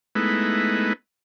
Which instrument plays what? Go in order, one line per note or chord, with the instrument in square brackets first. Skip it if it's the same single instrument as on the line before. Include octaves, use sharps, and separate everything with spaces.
[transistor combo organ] G#3 A3 B3 D#4 E4 B4